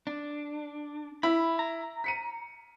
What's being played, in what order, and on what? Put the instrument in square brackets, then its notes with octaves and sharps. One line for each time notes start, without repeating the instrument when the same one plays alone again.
[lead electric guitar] D4
[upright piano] E4 [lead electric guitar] B5
[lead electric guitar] A#5
[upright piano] B6 C#7 D#7